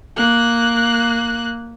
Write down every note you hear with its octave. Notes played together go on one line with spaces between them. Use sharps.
A#3 F#6